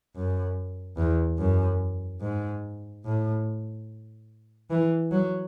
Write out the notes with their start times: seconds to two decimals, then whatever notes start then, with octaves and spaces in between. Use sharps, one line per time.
0.15 F#2
0.98 E2
1.38 F#2
2.21 G#2
3.05 A2
4.70 E3
5.12 F#3